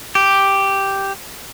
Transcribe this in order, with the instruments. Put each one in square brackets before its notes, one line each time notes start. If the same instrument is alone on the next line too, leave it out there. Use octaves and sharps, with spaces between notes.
[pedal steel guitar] G4